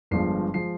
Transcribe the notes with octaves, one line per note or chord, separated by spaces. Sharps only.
G1 G2 F3 G#3 C7
F3 G#3 C7